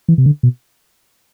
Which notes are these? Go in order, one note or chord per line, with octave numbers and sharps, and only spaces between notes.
E3
C3
D3
B2